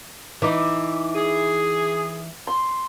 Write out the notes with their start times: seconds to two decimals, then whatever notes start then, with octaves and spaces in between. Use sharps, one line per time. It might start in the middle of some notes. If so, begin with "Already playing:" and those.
0.42 E3 D#4 D6
1.16 G#4
2.47 C6